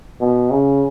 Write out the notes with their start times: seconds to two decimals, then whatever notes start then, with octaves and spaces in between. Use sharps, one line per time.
0.21 B2
0.51 C#3